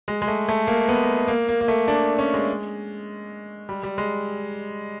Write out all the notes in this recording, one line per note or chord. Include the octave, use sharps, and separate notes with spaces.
G#3
G#3
A3
A3
A#3
B3
A#3
A#3
A#3
A3
D4
C#4
G#3
G3
G3
G#3